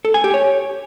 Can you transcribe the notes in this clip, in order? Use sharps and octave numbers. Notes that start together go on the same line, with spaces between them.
A4
G#5
G4
C#5